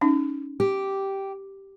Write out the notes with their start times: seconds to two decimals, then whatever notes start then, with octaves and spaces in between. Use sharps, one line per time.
0.01 C#4 D#4
0.60 G4